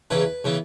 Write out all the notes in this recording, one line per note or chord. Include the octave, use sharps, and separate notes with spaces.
E2 C#3 E3 B3 B4
C#3 E3 B3